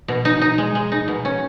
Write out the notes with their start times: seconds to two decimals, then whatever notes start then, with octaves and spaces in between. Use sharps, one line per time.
0.08 B2
0.25 D#4
0.41 D#4
0.58 G#3
0.75 G#3
0.92 D#4
1.08 B2
1.25 C#4